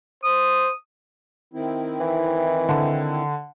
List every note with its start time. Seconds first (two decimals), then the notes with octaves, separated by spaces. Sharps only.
0.23 C5 D#6
1.54 D#3 C4 E4
2.00 E3
2.69 D3